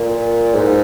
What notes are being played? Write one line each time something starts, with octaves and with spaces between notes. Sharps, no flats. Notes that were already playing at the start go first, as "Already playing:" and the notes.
Already playing: A#2
G#2